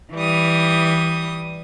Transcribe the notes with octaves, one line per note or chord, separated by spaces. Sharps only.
E3 G3 D#6